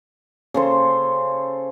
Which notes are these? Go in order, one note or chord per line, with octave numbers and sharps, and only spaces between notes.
C#3 A4 C5